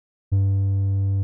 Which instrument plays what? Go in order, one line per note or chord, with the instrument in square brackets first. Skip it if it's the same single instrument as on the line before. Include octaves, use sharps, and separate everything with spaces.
[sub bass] G2